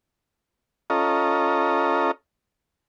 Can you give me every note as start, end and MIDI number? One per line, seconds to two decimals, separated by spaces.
0.90 2.11 61
0.90 2.11 65
0.90 2.11 69
0.90 2.11 75
0.90 2.11 82